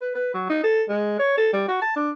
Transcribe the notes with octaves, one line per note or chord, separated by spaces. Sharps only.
B4
B4
F#3
D#4
A4
G#3
C#5
A4
G3
F#4
A5
D4